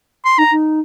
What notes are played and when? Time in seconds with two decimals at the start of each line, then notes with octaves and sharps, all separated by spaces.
0.25 C6
0.38 D#4 A#5
0.51 D#4